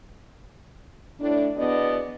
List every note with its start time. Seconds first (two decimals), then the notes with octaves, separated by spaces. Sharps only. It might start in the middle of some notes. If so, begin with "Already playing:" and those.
1.20 A2 D4
1.56 E2 B2 B3 D4 D5 D#5